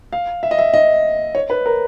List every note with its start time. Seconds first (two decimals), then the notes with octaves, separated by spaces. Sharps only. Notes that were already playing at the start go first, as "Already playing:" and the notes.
0.13 F5
0.43 E5
0.51 D#5
0.59 E5
0.74 D#5
1.35 C#5
1.50 B4
1.66 A#4